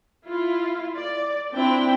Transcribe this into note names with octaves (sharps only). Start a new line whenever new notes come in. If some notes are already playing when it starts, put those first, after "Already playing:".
E4 F4
D5
C4 D4 E4 G5